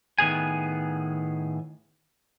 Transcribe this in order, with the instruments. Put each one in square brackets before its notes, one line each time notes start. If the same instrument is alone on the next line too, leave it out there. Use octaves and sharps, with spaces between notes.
[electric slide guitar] A2 D#3 B3 G#4 G#5